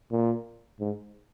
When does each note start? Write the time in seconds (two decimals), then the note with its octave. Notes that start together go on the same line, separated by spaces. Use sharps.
0.12 A#2
0.80 G#2